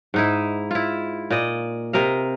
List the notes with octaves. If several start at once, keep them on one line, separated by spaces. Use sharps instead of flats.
G#2 D#4 E4
E4 F4
A#2 D5 D#5
C3 A#4 D#5 F5